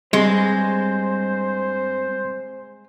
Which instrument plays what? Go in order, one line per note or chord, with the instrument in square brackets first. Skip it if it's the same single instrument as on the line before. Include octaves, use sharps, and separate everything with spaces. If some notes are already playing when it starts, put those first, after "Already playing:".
[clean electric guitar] G2 C4 C6 [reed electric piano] G3 [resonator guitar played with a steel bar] G#3 [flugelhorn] C5